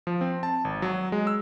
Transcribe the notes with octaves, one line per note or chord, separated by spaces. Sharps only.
F3
C4
A5
G#1
F#3
G#3
E6